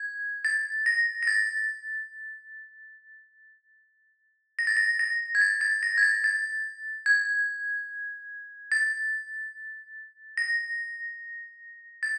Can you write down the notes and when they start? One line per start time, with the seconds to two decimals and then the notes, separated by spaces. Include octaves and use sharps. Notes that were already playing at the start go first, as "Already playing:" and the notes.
Already playing: G#6
0.45 A6
0.86 A#6
1.23 A#6
1.27 A6
4.59 A#6
4.67 A6
4.77 A#6
4.99 A#6
5.35 G#6
5.41 A6
5.61 A6
5.83 A#6
5.98 G#6
6.03 A6
6.24 A6
7.06 G#6
8.72 A6
10.37 A#6
12.03 A6